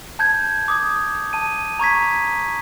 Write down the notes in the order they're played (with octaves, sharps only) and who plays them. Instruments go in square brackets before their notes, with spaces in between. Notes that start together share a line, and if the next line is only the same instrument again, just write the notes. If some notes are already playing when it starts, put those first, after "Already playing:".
[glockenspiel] A5 G6 G#6
D6 D#6 G#6
A5 D#7
A#5 C#6 G#6 B6